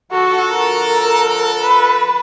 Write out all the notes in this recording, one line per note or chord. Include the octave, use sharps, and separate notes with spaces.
D3 F3 F#4 A4
A#4
B4